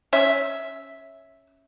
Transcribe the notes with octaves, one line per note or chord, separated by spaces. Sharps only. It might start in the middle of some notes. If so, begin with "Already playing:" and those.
C#4 E5